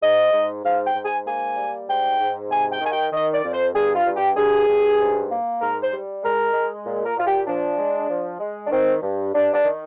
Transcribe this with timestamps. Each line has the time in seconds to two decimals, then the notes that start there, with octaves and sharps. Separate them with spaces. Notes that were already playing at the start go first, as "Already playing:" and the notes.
0.02 G#2 D#5
0.32 G#2
0.64 G#2 F5
0.85 G5
0.94 G#2
1.05 G#5
1.25 A#3 G#5
1.57 G3
1.88 G#2 G5
2.19 G#2
2.50 C3 G#5
2.71 G5
2.81 D#3 G#5
2.91 G5
3.12 D#3 D#5
3.33 D5
3.44 F2
3.53 C5
3.74 G2 G#4
3.94 F4
4.06 G2
4.15 G4
4.36 G2 G#4
4.68 G2
4.99 G#2
5.29 A#3
5.60 G#2 A#4
5.81 C5
5.92 G3
6.23 G#3 A#4
6.53 G#3
6.85 A#2
7.06 A#4
7.16 A#2 F4
7.26 G4
7.47 F3 D4
7.78 G#3
8.10 F3
8.40 G#3
8.66 D4
8.71 D#3 C4
9.02 G2
9.34 G2 D4
9.54 D4
9.64 D#3